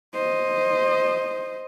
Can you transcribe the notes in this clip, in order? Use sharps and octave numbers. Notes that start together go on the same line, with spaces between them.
C5 D#5